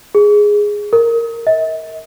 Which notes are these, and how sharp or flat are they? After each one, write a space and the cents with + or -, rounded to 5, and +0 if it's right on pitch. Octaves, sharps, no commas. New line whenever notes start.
G#4 +0
A#4 -10
D#5 +45